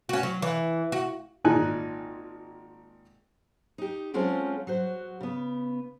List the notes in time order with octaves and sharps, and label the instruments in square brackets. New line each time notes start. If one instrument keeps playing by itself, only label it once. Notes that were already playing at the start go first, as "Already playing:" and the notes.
[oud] C#4 F#4
F#3
E3
F#4
[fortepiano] G#1 A#2 D#4 G#5 F#6
[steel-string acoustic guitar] D#4 G4
F#3 G#3 C4 C#4 F4 A4
F#3 F#4 C5
C#3 B3